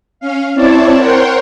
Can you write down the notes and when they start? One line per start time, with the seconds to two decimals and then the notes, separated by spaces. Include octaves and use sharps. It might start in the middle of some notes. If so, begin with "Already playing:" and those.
0.20 C#4 F5
0.54 C4 E4 C#5 D5 A5
0.97 A#4 C5 C#5 F#5 G5 C6